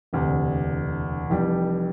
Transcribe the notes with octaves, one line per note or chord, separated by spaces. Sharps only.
E1 D2 C3
F1 F2 E3 G3